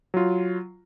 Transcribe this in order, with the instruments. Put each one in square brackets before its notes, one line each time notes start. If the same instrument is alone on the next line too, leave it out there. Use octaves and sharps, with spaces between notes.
[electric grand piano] F#3 F4